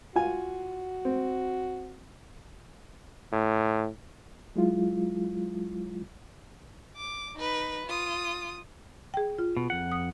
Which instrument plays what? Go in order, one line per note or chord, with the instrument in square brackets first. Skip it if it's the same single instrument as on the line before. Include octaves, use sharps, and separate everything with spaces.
[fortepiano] F4 G#5 [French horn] F#4
[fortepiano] C4
[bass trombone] A2
[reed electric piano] F#3 G#3 E4 F4
[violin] D6
D#4 B4
F4 D#6
[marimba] G#4 G5
F4
[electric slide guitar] B2
F2 F#5
[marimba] D#6